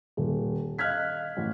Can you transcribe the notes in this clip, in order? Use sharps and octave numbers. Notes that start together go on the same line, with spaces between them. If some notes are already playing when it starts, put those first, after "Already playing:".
D#1
D#5 F5 F6 F#6 G#6 B6
A1